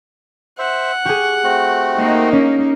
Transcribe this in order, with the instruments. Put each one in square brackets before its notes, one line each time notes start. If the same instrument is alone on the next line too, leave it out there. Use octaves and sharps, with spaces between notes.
[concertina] C5 E5 [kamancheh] F#5
[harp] G4 G#4 [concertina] C#6
[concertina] A3 C4 F#4
[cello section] A#3 D#4
[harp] C#4